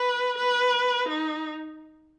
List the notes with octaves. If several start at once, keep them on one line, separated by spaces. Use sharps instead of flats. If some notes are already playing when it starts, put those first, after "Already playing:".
Already playing: B4
B4
D#4